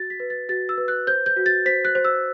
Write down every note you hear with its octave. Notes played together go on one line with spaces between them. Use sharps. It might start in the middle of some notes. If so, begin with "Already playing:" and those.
Already playing: F#4 A6
B6
B4
A6
F#4 A6
E6
B4
F#6
C5 G6
G6
F#4
A6
C5 B6
F#6
C5
E6